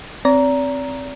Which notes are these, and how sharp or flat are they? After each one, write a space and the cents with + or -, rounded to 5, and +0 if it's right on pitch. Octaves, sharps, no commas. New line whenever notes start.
C4 +0 D5 -40 A#5 +0